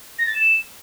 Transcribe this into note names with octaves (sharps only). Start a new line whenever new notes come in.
A#6
A6
E7